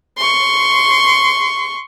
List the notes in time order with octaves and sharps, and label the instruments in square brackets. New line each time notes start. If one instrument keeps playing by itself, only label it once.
[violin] C6 C#6